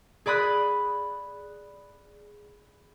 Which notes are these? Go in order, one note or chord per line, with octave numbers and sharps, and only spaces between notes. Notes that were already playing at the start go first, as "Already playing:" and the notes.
G#4 D5 B5 D#6 F#6